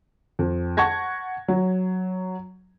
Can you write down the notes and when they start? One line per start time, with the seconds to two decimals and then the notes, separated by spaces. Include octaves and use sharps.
0.39 F2
0.77 F#5 A5 C#6 G#6 A#6
1.48 F#3